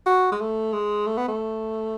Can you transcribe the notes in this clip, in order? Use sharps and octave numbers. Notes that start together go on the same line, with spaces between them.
F#4
G#3
A3
G#3
A3
B3
A3